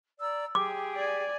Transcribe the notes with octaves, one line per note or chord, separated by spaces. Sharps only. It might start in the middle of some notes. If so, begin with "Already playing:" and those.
D5 A#5 E6
G4 G#4 G5 D6
D5 G#5